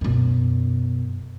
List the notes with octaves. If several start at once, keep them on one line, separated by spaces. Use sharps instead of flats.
F#2 B2